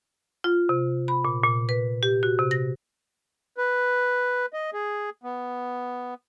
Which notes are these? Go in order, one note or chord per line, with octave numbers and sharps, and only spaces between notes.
F4
C3
B5
A#2
A#2
B4
G4
F#4
C3
A#6
B4
D#5
G#4
B3